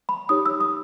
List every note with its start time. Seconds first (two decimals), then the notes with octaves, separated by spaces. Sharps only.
0.09 B5
0.29 D#4 G4 C#5 D#6
0.46 E6
0.61 D#6